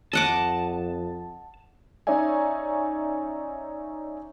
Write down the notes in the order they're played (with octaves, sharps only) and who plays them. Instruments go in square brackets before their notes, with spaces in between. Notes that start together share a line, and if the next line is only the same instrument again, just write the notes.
[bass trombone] F2 [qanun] D#5 F#5 D6 [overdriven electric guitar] A5
[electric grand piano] C#4 D#4 C#5 D5 E5 G#5